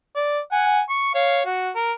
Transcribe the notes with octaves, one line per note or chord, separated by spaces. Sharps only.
D5
F#5 G#5
C#6
C#5 F5
F#4
A#4